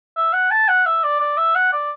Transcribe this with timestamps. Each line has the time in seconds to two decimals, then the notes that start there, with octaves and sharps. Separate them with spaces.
0.17 E5
0.33 F#5
0.51 A5
0.68 F#5
0.86 E5
1.03 D5
1.20 D5
1.37 E5
1.55 F#5
1.72 D5